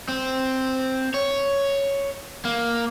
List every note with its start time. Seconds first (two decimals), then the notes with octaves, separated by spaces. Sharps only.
0.09 C4
1.14 C#5
2.45 A#3